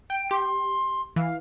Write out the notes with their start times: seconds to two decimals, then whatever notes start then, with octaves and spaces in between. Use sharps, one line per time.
0.10 G5 D7
0.31 G4 C6
1.16 E3 F5